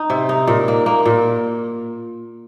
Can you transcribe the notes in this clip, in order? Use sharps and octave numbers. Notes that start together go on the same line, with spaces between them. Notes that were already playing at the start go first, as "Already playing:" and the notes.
Already playing: D#4
C3
D#4
A#2
A#3
A#3
A#2